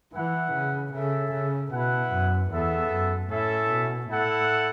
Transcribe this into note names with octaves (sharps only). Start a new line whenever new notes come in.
E3 E4 B4 F#5
C#3
C#3 C#4 A4 E5
C#3
B2 E4 B4 F#5
F#2
E2 B3 A4 E5
F#2
A2 C#4 E4 A4 E5
B2
A2 E4 A4 F#5